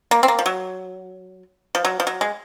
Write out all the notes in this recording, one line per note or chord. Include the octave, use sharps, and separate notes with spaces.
A#3
C4
A#3
F3
F#3
F3
F#3
F3
F#3
G#3